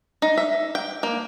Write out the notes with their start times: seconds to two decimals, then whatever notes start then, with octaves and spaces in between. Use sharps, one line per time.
0.22 D#4
0.38 E5
0.75 G5
1.03 A#3